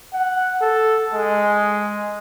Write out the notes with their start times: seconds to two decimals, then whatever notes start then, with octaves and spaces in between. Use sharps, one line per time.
0.13 F#5
0.61 A4
1.14 G#3